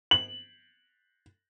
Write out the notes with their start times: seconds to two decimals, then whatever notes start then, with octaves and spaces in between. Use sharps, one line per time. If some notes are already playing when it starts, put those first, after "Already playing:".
0.11 F#7